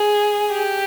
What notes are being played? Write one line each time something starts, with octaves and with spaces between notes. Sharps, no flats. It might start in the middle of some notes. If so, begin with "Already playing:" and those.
Already playing: G#4
G4